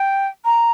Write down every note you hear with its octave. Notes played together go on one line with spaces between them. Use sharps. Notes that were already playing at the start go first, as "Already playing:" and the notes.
Already playing: G5
A#5